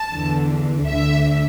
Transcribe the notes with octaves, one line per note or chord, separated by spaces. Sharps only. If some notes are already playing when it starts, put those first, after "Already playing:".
Already playing: A5
E2 D3
D2 D3 E5